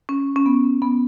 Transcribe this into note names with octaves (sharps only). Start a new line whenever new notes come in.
C#4
C#4
B3
B3